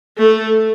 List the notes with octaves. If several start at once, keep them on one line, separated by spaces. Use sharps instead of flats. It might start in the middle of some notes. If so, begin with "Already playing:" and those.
A3